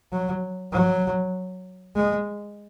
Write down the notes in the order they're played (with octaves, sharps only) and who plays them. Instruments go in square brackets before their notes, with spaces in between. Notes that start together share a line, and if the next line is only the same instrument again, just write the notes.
[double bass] F#3
F#3
G#3